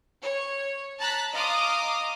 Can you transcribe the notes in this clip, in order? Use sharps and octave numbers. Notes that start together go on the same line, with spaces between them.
C#5
A5 A#5 F#6 A6 B6
D#5 F5 A#5 C6 D6 D#6